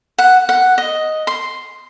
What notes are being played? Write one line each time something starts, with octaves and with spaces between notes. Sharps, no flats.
F#5
F#5
D#5
C6